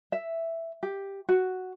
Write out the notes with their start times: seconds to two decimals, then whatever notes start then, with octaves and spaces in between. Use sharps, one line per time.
0.12 E5
0.83 G4
1.29 F#4